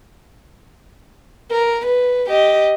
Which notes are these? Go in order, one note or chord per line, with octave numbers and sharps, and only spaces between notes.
A#4
B4
G4 D#5